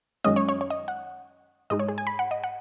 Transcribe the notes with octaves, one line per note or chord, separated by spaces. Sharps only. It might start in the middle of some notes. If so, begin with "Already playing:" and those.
F#2 D#3 G#3 C#4 D#5
C#5
C#5
C#5
D#5
F#5
G#2 G#3 D#4 D#5
C#5
G#4
G#5
B5
F#5
D#5
F#5